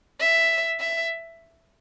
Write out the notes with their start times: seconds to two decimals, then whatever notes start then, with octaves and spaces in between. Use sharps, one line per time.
0.20 E5
0.80 E5